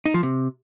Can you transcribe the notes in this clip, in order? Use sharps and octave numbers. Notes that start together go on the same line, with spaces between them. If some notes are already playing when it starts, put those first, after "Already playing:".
D#4
F3
C3